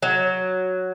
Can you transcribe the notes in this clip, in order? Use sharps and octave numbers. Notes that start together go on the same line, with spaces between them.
F#3